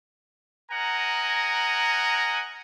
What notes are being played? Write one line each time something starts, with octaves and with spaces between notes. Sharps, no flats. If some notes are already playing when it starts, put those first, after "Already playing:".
A#4 D#5 F#5 G#5 A#5